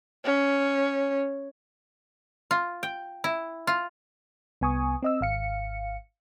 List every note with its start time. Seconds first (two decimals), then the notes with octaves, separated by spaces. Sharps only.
0.25 C#4
2.51 F4
2.83 G5
3.24 E4
3.67 F4
4.61 C2 B3 G#5 C#6 D#6
5.03 C4 D#5 E6
5.21 G#1 F5 C#7